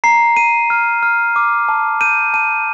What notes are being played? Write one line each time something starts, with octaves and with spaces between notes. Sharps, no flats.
A#5 C7
A#5 D#7
F6
F6
D6
A5
G6 D#7
A5 D#7